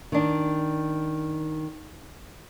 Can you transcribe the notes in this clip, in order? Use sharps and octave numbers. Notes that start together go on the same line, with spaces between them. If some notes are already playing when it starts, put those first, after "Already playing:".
D#3 D4